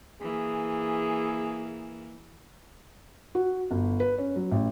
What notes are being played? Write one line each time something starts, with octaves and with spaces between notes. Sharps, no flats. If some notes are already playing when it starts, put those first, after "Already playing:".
E3 A#3 G#4
F#4
G1
B4
C#4
F#3
A1